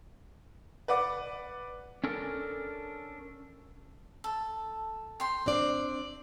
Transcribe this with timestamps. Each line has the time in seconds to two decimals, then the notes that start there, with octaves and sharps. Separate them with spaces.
0.88 B4 D5 F#5 D6
2.04 C#4 D4 A4 A#4
4.24 A4
5.20 G5 C6
5.46 C4 D4 D5